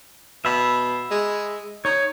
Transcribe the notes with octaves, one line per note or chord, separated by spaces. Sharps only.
B2 E5 B5
G#3
D#4 C#5